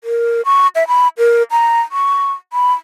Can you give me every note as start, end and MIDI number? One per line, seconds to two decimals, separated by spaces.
0.04 0.41 70
0.45 0.67 85
0.75 0.87 76
0.88 1.08 83
1.18 1.43 70
1.51 1.81 82
1.92 2.31 85
2.53 2.73 83